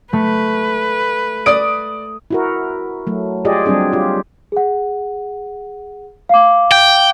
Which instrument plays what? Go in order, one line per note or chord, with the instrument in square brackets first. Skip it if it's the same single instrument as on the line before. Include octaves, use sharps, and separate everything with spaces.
[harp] A3 [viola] B4
[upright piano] D5 D#6 D7
[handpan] E4 F#4 A#4
F#3 A3
F4 G4 G#4 D5 D#5
F#3 G3 C4 D4 G#4
F4 G4
[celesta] G#4 F#5
F5 D6
[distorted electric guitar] G5